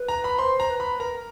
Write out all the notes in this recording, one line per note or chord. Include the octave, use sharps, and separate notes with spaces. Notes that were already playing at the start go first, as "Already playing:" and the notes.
Already playing: B4
A#5
B5
C5 C6
A#5
B4
B5
A#4 A#5